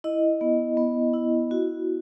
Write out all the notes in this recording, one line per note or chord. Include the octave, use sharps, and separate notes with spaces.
E4 D#5
B3
B3
E4
F#4